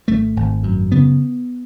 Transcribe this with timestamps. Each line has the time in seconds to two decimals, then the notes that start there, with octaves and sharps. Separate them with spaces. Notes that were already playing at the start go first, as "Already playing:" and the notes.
0.08 G#1 A3
0.37 G#1
0.63 F#2
0.92 C#3 B3